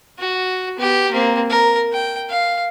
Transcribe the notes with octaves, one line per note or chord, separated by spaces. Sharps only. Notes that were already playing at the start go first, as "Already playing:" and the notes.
F#4
B3 G4
A#3 C4
A#4
G5
F5